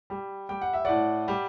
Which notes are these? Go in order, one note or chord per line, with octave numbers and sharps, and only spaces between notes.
G3
G3 G5
F#5
E5
A2 D5 F#5
G3